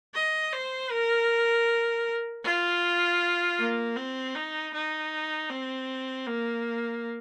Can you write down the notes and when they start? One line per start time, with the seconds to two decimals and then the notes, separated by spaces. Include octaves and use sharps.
0.14 D#5
0.52 C5
0.91 A#4
2.43 F4
3.59 A#3
3.97 C4
4.35 D#4
4.74 D#4
5.50 C4
6.26 A#3